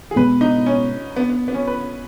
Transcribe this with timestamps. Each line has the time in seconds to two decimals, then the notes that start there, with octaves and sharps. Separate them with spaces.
0.11 G#4
0.16 B2 G#3 B3 B4
0.41 D#4
0.66 C#4
1.16 B3
1.30 B3
1.48 B3
1.54 C#4
1.67 B4